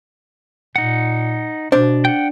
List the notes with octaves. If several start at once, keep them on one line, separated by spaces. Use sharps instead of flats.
A#2 D#4 F#5
B2 D4 C5
F#5 G5